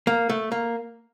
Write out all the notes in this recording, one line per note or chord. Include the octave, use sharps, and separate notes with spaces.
A#3
A3
A#3